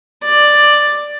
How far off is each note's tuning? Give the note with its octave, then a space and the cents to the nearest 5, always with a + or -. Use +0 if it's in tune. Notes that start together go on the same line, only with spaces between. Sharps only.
D5 +5